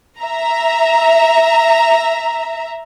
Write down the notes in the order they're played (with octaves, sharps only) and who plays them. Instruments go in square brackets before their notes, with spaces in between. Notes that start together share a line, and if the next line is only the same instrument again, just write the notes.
[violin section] E5 A#5